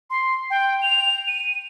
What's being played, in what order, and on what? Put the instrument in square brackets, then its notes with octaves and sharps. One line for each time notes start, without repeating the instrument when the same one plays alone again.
[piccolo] C6
G5
F7
D#7